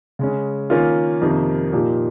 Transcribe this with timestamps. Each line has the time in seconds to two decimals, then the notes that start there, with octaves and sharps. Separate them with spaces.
0.19 C#3 G#3 C#4
0.70 D#3 A#3 C#4 F4
1.21 F2 C3 D#3 A#3
1.73 A#2 F3 A#3 D#4 G4